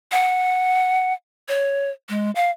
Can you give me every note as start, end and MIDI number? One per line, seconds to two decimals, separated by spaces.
0.12 1.13 78
1.48 1.90 73
2.09 2.31 56
2.35 2.50 77